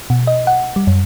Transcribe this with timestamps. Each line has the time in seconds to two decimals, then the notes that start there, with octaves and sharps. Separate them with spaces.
0.10 B2
0.27 D#5
0.47 F#5
0.76 G3
0.87 F#2